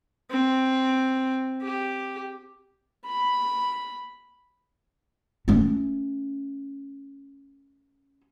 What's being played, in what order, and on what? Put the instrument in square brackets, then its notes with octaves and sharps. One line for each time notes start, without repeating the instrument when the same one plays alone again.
[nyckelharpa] C4
G4
B5
[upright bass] A3 C#4